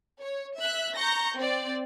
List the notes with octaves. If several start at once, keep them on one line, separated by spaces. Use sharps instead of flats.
C#5
E5 F#6
A#5 C#6 G6 A#6
C4 D5